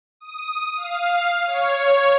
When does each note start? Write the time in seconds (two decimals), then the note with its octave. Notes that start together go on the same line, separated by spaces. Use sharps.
0.20 D#6
0.77 F5
1.47 C#5
1.85 C#5